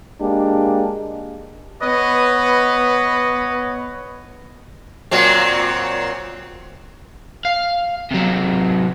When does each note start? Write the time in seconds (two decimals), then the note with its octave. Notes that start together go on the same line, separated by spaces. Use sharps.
0.19 G#3 A#3 D4 G4
1.82 B3 B4 C#5 D#5
5.11 A#2 F#3 C4
7.45 F5
8.11 C3 F#3